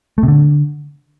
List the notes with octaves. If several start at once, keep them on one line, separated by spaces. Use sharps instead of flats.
A3
C3
D3